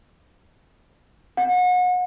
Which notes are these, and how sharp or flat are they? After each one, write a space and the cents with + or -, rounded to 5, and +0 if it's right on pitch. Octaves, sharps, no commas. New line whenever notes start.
F#5 -35